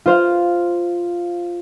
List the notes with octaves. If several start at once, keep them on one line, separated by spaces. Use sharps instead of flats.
F4 C5 F5